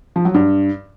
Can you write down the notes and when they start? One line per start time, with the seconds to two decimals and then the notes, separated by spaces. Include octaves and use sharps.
0.16 F3
0.25 F#3
0.34 G2